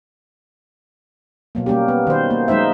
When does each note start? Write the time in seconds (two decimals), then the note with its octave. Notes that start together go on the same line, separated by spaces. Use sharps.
1.55 B2 F#3 A#3
1.66 G3 A#3 C#4 G4
1.88 B3
2.07 D#3 C5
2.30 A#3
2.48 F#3 G#3 D#4 C5 E5